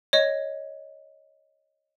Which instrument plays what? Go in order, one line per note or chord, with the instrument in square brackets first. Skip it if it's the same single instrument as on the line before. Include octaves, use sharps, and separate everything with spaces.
[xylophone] C#5 D#5